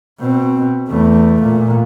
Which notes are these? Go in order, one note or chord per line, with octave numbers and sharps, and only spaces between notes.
B2 C4
E2 A3
A#2